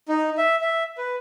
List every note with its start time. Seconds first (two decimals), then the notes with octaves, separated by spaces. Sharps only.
0.09 D#4
0.37 E5
0.61 E5
0.98 B4